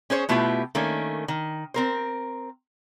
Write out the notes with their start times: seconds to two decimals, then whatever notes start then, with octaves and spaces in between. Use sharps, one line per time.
0.10 C#4 G#4 C5 C#5
0.29 B2 A3 B3 E4 F4 G4
0.75 D#3 A3 A#3 C#4 D4
1.28 D#3
1.74 C4 A#4 C5